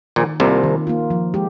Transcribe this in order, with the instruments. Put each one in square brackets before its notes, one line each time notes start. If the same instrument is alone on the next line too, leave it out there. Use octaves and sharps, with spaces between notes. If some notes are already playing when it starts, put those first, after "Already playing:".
[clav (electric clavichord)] A#1 A#2 [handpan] D#3
[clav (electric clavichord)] C2 C3 [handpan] A#3 F4
[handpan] D#3
A#3 F4
F3
G#3 G4